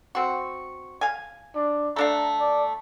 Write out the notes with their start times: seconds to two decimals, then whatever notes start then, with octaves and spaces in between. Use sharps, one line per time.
0.15 C4 F#4
1.01 F5 G#5
1.55 D4
1.96 A3 D4 F5 A#5
2.40 D5